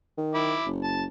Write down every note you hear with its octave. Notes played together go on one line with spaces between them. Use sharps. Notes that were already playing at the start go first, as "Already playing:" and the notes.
D#3
E4 B5 D6
F#1
A5